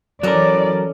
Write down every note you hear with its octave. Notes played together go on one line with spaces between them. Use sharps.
E3 F#3 C#4 A4 A#4 D5 D#5